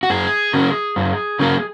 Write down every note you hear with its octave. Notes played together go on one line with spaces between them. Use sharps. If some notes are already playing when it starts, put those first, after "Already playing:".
F#4
F#2 G#4
C#3 F#3 A#3
F#2
C#3 F#3 A#3